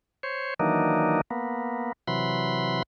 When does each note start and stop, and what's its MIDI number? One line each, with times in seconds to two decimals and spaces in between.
0.23 0.54 72
0.23 0.54 73
0.60 1.21 51
0.60 1.21 52
0.60 1.21 54
0.60 1.21 58
0.60 1.21 62
0.60 1.21 63
1.31 1.92 58
1.31 1.92 59
2.08 2.82 48
2.08 2.82 52
2.08 2.82 54
2.08 2.82 83
2.08 2.82 84